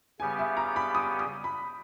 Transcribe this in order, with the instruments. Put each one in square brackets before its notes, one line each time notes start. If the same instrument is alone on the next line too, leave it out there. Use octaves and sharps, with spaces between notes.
[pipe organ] C#3 G3 B3 G4 [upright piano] G#5
[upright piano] E5
A#5
B5
D#6
D#6
B5